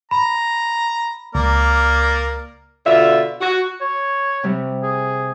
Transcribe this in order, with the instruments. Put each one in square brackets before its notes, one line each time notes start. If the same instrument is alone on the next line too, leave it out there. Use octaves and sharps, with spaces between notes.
[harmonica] A#5 [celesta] B5
[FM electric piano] C#2 [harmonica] A#3 A#4 D5
[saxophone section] B2 D3 F4 E5
F#4
[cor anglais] C#5
[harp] C3 G3
[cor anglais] G#4